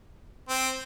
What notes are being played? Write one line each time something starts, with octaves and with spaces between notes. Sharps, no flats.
C4